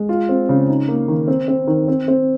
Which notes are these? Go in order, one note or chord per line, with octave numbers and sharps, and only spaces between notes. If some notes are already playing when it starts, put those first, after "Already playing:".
Already playing: G#3
F4
C4
C#3
D#4
A#3
D#3
C4
C4
D#3
C4
C4